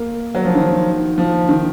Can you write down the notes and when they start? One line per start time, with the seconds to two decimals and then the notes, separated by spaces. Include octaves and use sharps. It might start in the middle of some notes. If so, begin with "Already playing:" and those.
Already playing: A#3
0.35 F#3
0.45 F3
0.55 D#3
1.18 F3
1.49 D#3